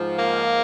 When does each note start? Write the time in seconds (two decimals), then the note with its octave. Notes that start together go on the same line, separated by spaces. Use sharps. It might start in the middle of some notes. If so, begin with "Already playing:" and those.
Already playing: G#2 F3
0.18 A#3